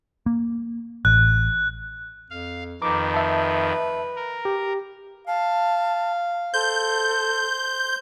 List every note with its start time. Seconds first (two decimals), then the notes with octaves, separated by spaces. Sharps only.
0.26 A#3
1.05 A1 F#6
2.30 F2 F5
2.82 F2 D#3 B4 A#5 D6
3.14 E5 A5
4.16 A#4
4.45 G4
5.27 F5 A5
6.54 A4 C5 G6